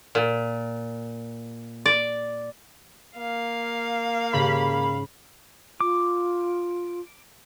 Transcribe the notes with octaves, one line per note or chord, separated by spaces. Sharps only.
A#2
D5
A#3 F5
G#2 C#3 B5
F4 D6